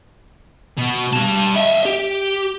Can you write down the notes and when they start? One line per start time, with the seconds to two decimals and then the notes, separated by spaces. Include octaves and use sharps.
0.78 B2
1.13 G3 A5
1.56 D#5 E5
1.85 G4